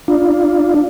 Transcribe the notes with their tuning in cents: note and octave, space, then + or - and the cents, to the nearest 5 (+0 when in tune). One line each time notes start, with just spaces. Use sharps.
D4 +0 F4 +0